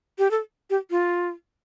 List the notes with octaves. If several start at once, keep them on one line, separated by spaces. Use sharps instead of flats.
G4
A4
G4
F4